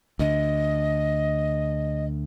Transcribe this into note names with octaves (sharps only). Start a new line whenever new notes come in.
D2 D3 D#5